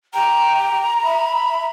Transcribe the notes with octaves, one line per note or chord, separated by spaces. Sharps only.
G4 G5 A#5
E5 B5